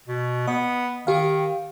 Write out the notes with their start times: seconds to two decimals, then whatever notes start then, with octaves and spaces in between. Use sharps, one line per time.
0.08 B2
0.47 B3 D#5
1.07 D#3 G4 F5